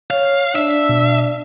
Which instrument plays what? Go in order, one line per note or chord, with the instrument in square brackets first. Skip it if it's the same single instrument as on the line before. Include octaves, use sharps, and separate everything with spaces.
[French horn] C#5 [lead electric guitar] F5
[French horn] D4 [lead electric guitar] E5
[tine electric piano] B2